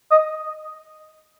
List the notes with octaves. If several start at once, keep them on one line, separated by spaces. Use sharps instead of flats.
D#5